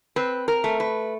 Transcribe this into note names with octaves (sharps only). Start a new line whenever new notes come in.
C4 B4
A#4
A3
B4